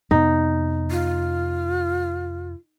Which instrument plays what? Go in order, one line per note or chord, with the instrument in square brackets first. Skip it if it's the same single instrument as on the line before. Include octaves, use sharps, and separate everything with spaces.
[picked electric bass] F2 C3 B3 [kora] D#4
[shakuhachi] F4